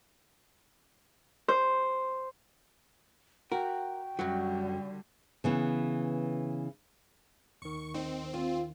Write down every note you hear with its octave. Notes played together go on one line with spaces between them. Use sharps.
C5
F#4 A#4 G5
F#2 D3 F#3 G3 F#4
C#3 E3 B3
D#2 D#3 C#6
C4 D#4
F4